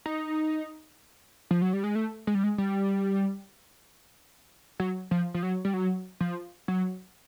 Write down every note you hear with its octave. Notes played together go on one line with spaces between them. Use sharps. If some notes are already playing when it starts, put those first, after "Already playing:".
D#4
F3
F#3
G3
G#3
A3
G#3
G3
G#3
G3
F#3
F3
F3
F#3
G3
F#3
F3
F#3